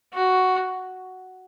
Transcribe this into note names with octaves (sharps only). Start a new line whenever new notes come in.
F#4